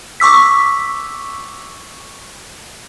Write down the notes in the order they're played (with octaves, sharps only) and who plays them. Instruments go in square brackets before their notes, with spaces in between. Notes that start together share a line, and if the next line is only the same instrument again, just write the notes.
[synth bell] C#6 D6 E6 B6